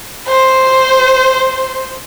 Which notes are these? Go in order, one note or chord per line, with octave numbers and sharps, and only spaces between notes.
C5